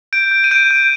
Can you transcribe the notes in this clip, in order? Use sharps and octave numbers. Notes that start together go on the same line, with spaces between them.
G6 D7
G6
D#7
G6 D7
G6